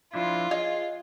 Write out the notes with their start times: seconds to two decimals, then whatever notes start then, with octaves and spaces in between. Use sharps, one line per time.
0.14 F3 D4 E4 F4
0.51 G#4 C#5 D#5 F5